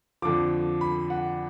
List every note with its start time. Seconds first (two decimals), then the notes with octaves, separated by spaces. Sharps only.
0.22 F2 D3 F3 D6
0.81 B5
1.10 F#5